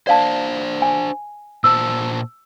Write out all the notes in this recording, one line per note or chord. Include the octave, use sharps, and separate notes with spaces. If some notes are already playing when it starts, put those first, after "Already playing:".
D4 C5 D5 F5 A5
G#5
A#2 C5 A5 E6